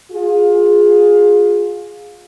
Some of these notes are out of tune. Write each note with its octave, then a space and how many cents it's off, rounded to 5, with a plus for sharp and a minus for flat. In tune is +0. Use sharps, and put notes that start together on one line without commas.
F4 +25 G#4 +0